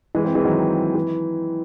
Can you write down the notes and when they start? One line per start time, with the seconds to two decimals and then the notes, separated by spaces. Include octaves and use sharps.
0.15 E3 G#3
0.25 G#3 C4
0.35 E3 G#3
0.45 D#3 F#3
0.95 E3